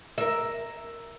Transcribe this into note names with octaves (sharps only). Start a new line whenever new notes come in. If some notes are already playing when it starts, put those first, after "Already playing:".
A#4 E5